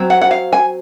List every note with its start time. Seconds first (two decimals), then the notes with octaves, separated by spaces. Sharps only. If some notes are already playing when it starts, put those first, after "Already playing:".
Already playing: F#3 C4
0.10 F#5
0.22 F#5
0.31 F5
0.53 G#5